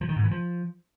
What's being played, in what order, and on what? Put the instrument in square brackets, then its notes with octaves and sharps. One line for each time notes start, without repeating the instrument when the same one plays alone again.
[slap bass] F3
D#3
G#2
E3
F3